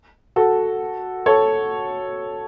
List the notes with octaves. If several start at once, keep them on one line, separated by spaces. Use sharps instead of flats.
F#4 A4
A4 C#5